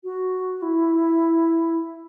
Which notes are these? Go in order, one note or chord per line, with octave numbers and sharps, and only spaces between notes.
F#4
E4